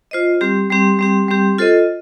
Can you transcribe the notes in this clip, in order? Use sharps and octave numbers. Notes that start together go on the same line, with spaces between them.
F4 C5 D#5
G3 C4 G4
G3 C4 G4
G3 C4 G4
G3 C4 G4
F4 A4 C5 D#5